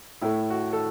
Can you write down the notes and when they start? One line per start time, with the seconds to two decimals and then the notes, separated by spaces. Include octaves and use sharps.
0.22 A2 A3 E4
0.50 F#4
0.73 A4